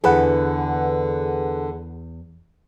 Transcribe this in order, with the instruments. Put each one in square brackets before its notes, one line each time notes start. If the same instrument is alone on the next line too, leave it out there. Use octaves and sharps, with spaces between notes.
[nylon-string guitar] E2 E4 A4 [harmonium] D3 [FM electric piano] G#4 B4 F#5